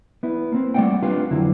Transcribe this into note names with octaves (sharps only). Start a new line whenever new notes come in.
B3 E4
A#3 C4
G3 A3 D5 E5 F#5 G5
C4 D4 F4 G4 B4 F5
F2 D3 F#3 E4